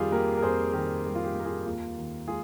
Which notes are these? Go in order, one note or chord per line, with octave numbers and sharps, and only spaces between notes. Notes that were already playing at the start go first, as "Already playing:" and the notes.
Already playing: F2 D#3 G3 F4 G4 G#4
A#3 G4 A#4
A#4
F2 G#4 C5
D#3 G4 A#4
G3 G4
F4
G4
A#3
A#4
F4 G#4
D#2 F4
D#3
G#3 F4 G#4